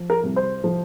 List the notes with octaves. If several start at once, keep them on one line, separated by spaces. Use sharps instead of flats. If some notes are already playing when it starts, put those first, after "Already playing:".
Already playing: F3
A#4
C2
C5
F3